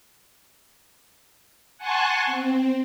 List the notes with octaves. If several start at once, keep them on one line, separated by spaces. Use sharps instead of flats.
F#5 G#5 A5 C6 C#6 F#6
C4